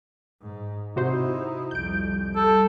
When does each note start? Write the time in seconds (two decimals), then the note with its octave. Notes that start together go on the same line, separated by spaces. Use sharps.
0.42 G#2
0.96 C3 D#4 E4 F#4 C5
1.71 C2 F2 G6 D7
2.35 G3 A4